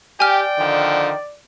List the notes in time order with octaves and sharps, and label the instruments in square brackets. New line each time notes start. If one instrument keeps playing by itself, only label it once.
[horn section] G4 [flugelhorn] D5 [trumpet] G5 [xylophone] G#5 F6
[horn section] D3 D#3 F3